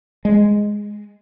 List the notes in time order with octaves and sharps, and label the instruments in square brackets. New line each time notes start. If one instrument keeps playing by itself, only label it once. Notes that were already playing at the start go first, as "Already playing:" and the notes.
[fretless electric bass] G#3